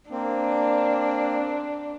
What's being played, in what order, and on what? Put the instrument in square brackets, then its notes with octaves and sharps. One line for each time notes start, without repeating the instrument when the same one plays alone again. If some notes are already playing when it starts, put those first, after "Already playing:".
[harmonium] A#3 C4 [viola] D4